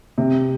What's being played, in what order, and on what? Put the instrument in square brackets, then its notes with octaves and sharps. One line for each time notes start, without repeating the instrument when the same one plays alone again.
[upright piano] C3